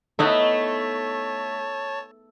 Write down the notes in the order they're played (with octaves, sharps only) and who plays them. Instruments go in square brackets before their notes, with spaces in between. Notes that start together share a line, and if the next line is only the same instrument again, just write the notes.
[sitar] A3 [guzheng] B3 D#4 E4 [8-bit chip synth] C#5 A5